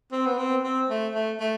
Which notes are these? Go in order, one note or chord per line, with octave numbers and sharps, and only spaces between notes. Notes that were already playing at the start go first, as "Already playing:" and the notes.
C4
B3
C4
C4
A3
A3
A3